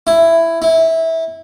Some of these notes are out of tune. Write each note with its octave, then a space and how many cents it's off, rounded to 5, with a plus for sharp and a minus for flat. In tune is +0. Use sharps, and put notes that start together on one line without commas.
E4 +5
E4 -20